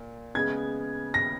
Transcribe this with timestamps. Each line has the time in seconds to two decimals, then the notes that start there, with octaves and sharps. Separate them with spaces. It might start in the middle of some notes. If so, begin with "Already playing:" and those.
Already playing: A#2
0.35 C#3 G#3 B3 G#6
1.14 A#6